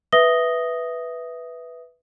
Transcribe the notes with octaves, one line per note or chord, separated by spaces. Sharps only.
B4 E5 D#6 A#6 G7